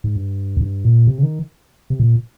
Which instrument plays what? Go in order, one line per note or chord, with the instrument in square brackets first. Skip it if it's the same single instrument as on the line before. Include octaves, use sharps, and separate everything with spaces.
[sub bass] G#2
G2
F2
G2
A#2
C3
C#3
D#3
C3
A#2